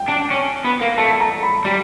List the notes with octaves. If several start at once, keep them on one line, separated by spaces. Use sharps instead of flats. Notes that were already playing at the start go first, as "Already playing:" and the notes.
Already playing: G5
D4
C#4
B3
A#3
A3 A5
A#5
B5
G3